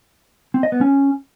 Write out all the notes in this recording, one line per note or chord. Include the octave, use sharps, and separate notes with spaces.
C4
D#5
B3
C#4